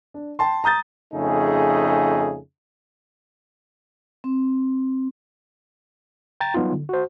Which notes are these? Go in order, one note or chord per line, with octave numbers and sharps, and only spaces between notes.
D4
G5 A5 C6
A#5 D#6 G6 A6
F2 C#3 A3 D#4 G#4
C4
G5 A#5 A6
F#3 G3 B3 D#4 F4
D3
F#4 C5